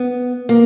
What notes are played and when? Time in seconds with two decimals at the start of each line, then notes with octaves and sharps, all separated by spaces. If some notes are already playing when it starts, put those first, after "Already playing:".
Already playing: B3
0.49 A#3